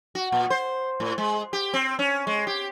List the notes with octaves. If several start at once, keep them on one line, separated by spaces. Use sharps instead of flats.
F#4
A#2
C5
A2
G#3
G4
C4
C#4
G#3
G4